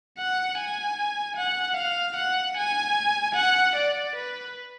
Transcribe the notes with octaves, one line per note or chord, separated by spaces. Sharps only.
F#5
G#5
F#5
F5
F#5
G#5
F#5
D5
B4